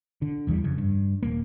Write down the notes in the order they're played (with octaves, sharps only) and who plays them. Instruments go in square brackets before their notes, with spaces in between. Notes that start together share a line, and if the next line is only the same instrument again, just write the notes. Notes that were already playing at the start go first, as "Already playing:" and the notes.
[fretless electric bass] D3
E1 E2 E3 G3
F2 C#3
G2
D#1 A#3